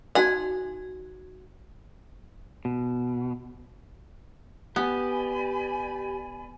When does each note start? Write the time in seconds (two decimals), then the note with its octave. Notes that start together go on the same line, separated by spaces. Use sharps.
0.15 D#4 F#4 F#5 G#5
2.65 B2
4.76 B3 G4 D5 G#5 B5